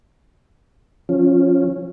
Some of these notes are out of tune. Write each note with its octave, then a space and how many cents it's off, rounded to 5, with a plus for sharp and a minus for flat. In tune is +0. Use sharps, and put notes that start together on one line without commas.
F3 +5 C#4 -15